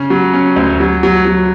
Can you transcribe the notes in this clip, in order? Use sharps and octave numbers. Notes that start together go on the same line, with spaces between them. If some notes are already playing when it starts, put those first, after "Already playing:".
Already playing: C#3 C#4
F#3
C#4
D2
F#3
F#3
F#3